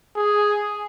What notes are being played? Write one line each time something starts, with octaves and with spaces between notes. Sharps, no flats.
G#4